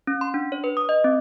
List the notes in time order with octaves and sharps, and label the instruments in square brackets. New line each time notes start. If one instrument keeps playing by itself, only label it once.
[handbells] C#4
C6
D4
C#5
B4
D#6
D#5
C4